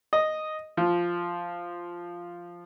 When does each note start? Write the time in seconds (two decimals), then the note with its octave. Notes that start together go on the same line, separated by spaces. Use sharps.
0.13 D#5
0.77 F3